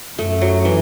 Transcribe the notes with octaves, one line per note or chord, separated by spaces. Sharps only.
F#2 A3
F#3
E3